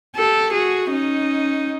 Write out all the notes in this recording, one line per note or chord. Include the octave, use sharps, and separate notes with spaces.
G4 A4
F#4 G#4
C#4 D#4